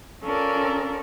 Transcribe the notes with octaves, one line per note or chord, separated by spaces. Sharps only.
C#4 F4 A4 A#4 D5